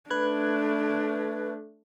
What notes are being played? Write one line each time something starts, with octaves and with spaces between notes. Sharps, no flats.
A3 D4 B4 F#6 G#6